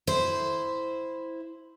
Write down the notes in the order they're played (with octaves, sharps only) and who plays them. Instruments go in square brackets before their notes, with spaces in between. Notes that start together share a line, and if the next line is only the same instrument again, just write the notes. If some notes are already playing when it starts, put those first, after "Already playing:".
[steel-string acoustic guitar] E4 C5